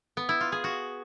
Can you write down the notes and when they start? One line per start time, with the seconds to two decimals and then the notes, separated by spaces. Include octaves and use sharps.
0.17 B3
0.29 E4
0.40 F4
0.52 G#4
0.64 F#4